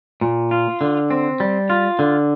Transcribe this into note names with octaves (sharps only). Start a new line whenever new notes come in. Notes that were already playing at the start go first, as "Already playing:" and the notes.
A#2
F4
D3
C4
G3
F4
D3